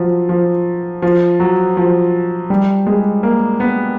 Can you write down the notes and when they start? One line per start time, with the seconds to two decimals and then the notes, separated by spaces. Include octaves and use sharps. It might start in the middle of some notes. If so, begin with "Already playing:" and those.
Already playing: F3 F#3
0.29 F3
1.02 F3
1.40 F#3
1.77 F3
2.50 G3
2.87 G#3
3.23 A#3
3.60 B3